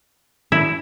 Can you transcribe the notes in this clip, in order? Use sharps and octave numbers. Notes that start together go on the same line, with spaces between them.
E4